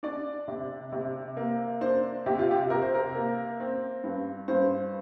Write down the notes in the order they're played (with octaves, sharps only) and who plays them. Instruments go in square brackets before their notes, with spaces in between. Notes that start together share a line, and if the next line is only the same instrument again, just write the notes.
[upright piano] D4 D5
C3
C3
A#3
D4 C5
C3 G4
F4
G4
C3 A#4
C5
A#4
A#3
C4
G2
G2 C5